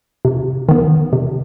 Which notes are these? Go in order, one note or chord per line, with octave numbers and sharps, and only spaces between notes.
C3
D#3 B3
C3